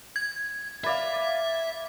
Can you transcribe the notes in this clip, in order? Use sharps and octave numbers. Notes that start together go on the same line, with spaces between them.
G#6
B4 D5 E5 F5